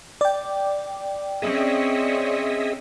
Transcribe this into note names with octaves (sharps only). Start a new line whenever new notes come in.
D5 G5
C4 C#4 G#4 D#5 E5